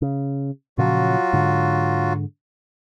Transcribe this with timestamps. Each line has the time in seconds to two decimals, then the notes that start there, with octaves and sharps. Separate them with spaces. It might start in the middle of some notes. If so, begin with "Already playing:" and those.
0.02 C#3
0.78 A#2 C#3 F3 F#3 F4 F#4
1.33 G#2 D3